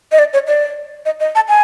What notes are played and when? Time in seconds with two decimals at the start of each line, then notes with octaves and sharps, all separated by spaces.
0.12 D#5
0.19 D5
0.33 C#5
0.48 D5
1.06 D#5
1.20 D#5
1.35 A5
1.49 G#5